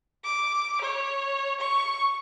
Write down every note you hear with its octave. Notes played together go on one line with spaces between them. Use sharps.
D6
C#5
C#6